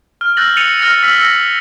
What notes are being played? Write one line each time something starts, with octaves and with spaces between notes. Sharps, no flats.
F6
E6 F#6 G6 A6 A#6 F#7
A6 C#7 D#7 F7
F6 A6 A#6 D#7 F7
E6 F6 B6 F#7
E6 A#6 C#7